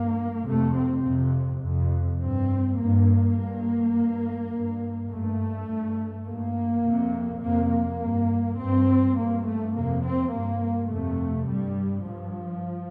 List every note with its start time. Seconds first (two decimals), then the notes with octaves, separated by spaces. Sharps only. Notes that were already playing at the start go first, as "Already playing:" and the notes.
Already playing: G2 A#3
0.47 F2 C3 A3
0.76 C4
1.05 F2 C3
1.63 F2 C3
2.21 G2 C4
2.79 G2 A#3
3.37 G2
3.95 G2
4.53 G2
5.11 G2 A3
5.69 G2
6.27 G2 A#3
6.85 F2 C3
7.42 F2 C3 A#3
7.72 A#3
8.01 G2
8.59 G2 C4
9.17 G2 A#3
9.46 A3
9.75 F2 C3 A#3
10.05 C4
10.32 G2 A#3
10.90 F2 C3 A3
11.49 G2 G3
12.06 G2 F3